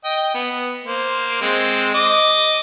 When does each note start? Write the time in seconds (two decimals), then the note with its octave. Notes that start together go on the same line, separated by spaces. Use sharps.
0.05 D#5 G5
0.34 B3
0.85 A#3 C5
1.41 G#3 C4
1.94 D#5 D6